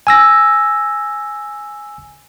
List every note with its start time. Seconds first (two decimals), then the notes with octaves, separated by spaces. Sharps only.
0.07 G#5 E6 A#6